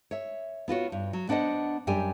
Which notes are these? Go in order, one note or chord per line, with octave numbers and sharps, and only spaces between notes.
C#5 E5
B3 F4 F#4 C#5
G2
F#3
B3 D4 C5 D#5 F#5
F#2 G3 D4 G4 G#5